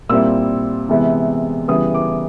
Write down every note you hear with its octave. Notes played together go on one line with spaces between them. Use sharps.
A#2 G3 C4 E4 E6
C3 E3 G#3 B3 E4
C#3 E3 G3 B3 D#6
D6